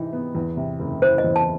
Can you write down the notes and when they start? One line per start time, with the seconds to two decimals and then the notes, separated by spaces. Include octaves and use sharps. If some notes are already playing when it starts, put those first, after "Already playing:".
Already playing: C3 E3 D#4
0.13 B3
0.35 E2
0.57 C3
0.80 F#1
1.02 E3 C5
1.18 D#5
1.24 E2
1.36 A5